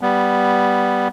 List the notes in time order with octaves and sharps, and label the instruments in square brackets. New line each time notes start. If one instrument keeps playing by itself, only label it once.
[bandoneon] G3 B3